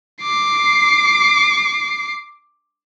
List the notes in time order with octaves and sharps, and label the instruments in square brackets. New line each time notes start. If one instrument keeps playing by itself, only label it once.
[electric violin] D6 C7